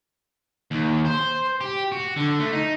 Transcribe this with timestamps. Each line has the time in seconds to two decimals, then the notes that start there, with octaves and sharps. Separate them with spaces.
0.71 D#2
1.06 C5
1.61 G4
1.92 F#4
2.17 D3
2.39 A3
2.52 D#4